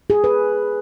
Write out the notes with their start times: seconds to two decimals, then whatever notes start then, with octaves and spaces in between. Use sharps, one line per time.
0.10 G#4
0.24 B4